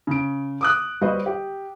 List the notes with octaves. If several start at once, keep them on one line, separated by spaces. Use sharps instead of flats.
C#3 D7
D6 D#6 F#6
G3 F#4 B4 C5 D#5
G4